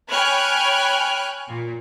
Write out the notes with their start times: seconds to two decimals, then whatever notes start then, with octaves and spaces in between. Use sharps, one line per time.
0.11 C#5 G5 G#5 B5 F6 F#6
1.48 A#2